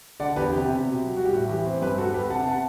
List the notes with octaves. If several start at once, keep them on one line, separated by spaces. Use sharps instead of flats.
D3 D5 F#5
E2 G4 B4
C3 G4
C3
B2
F#3
G3 F#4
G4
A2 F#4
E3 G4
C4
G2 G4 B4
G3 F#4 A4
B3 G4 B4
C3 F#5 A5
F#5 A5